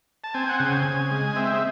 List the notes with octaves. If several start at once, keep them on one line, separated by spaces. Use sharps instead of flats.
A5
C4 G#5
F#5
C#3 G#5
C#3
G#3
C4 E5